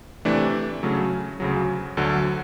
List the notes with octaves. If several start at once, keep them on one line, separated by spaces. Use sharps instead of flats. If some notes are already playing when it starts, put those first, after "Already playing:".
C3 E3 A3 D4
C#3 F#3 A3 C#4
D2 C#3 F#3
D2 D3 F#3